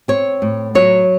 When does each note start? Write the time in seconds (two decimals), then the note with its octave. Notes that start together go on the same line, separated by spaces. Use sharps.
0.08 C4 C#5
0.42 A2
0.75 F#3 C#5